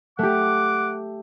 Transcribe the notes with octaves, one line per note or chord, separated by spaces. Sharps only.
A3 G4 F#5 D6